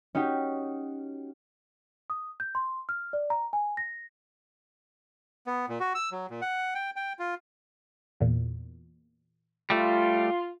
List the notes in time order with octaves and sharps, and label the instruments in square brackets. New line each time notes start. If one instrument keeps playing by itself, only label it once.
[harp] C#4 D#4 F#4 G4
[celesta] D#6
G6
C6
F6
D5
A#5
G#5
A#6
[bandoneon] B3
A#2
F#4
E6
F#3
A#2
F#5
G5
G5
F4
[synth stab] E2 A#2
[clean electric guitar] G3 A3 [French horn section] F4